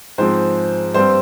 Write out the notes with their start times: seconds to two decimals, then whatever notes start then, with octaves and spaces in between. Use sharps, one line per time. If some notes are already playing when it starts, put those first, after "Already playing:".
0.18 G#2 F3 G#3 C4 C5
0.94 G2 G3 C4 C5